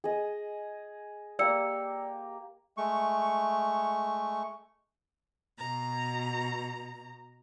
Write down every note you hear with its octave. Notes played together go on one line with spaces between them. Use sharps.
G#4 D#5
A#3 G4 D5 F5 E6 C#7
G#3 A3 C#6
B2 A#5